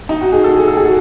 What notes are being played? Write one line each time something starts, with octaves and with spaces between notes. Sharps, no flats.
D#4
F#4
G#4
A4
G#4
A4
G#4
F#4